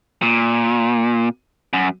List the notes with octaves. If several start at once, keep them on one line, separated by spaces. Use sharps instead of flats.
A#2
F#2